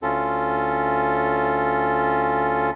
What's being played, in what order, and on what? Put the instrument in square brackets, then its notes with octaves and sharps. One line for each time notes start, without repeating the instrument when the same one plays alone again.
[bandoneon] D2 C#4 F4 A4